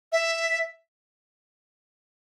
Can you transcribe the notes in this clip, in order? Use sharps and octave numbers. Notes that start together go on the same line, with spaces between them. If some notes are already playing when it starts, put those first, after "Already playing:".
E5